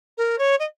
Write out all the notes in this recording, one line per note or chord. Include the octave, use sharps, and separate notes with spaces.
A#4
C#5
D#5